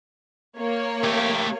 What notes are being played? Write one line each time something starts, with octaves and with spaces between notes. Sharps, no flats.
A#3 C#5
A3 G4